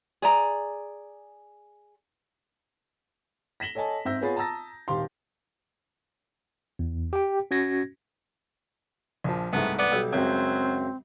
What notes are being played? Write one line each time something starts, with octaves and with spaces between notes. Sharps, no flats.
G#4 D5 A#5
A#6 B6 E7 F#7 G7
A4 C#5 D#5 G#5 A5
G#2 C4 E5 E6 G6 A#6
B3 F4 G#4 C#5 B5 A6
A5 A#5 D#6 E6 A6 A#6
D#1 G#1 G4 F5 C6
E2
G4 G5
C#4 F#4 G#6 A#6
A#1 F3
C2 G#2 A3 B3
B3 D5
B1 G3
C#2 F#2 F#3 C4